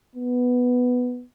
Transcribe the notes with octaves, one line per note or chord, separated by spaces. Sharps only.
B3